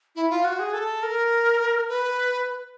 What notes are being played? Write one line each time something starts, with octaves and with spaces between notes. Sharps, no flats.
E4
F4
F#4
G#4
A4
A#4
B4